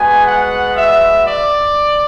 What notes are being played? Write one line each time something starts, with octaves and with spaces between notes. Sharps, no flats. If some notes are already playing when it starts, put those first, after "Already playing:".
Already playing: G#3 B3 F#4 G#5
F#5
E5
D5